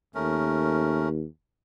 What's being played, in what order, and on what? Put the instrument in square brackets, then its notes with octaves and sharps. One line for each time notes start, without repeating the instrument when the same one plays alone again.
[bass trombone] D#2 [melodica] A3 C#4 A#4